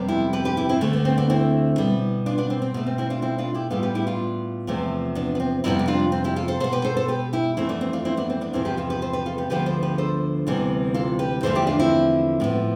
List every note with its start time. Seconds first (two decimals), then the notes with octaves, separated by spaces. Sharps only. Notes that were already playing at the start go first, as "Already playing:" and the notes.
Already playing: F2 C3 G3 B3
0.08 E4 G4
0.33 G4 B4
0.45 G4 B4
0.57 E4 G4
0.69 C4 E4
0.81 D2 D3 A3
0.93 B3
1.05 C4
1.18 B3 D4
1.30 C4 E4
1.78 B2 G3 B3
2.26 D4 F4
2.38 B3 D4
2.50 C4
2.62 C4
2.74 B2 A3 B3
2.87 C4
2.98 C4 E4
3.10 D4 F4
3.22 C4 E4
3.38 D4 F4
3.54 E4 G4
3.70 A2 G3 B3 F4 A4
3.83 G4 B4
3.95 E4 G4
4.07 D4 F4
4.67 E2 C3 F3 A3
5.15 B3 D4
5.35 B3
5.40 C4
5.64 F2 C3 G3 B3 C4 E4
5.79 G4
5.88 D4 F4
6.12 C4
6.24 E4 G4
6.36 F4 A4
6.48 A4 C5
6.60 B2 B3 A4 C5
6.72 G4 B4
6.85 A4 C5
6.97 A4 C5
7.08 G4 B4
7.33 E4 G4
7.57 F2 E3 A3 C4 E4
7.69 B3 D4
7.81 C4
7.93 D4 F4
8.05 C4 E4
8.17 B3 D4
8.30 C4
8.41 B3 D4
8.53 E2 C3 F3 C4 E4
8.65 G4 B4
8.77 F4 A4
8.90 G4 B4
9.02 A4 C5
9.13 G4 B4
9.26 F4 A4
9.38 G4 B4
9.50 D2 D3 F3 B3 G4 B4
9.66 A4 C5
9.82 G4 B4
9.98 A4 C5
10.47 D2 C3 E3 G3 B3
10.94 F4 A4
11.19 G4 B4
11.43 E2 D3 F3 A3 A4 C5
11.55 E4 G4
11.67 D4 F4
11.79 C4 E4
12.40 A2 F3 B3